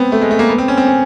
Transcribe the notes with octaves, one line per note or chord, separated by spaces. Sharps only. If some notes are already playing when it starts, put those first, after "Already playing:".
Already playing: B3 C4
A3
G#3
A3
A#3
B3
C4
C#4
C4
C#4